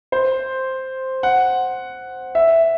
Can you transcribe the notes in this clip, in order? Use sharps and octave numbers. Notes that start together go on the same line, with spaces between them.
C5
F#5
E5